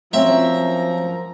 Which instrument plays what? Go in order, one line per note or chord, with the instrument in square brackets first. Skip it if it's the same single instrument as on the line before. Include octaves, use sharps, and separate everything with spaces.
[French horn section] F#2 F3 [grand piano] C4 C#4 [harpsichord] E5 [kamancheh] A#5